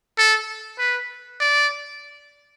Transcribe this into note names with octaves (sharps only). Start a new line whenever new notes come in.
A4
B4
D5